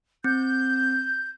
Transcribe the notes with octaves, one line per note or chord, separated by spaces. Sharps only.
C4 G6